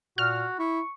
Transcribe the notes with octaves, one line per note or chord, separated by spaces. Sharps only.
A#2 F#4 F6
E4 C#6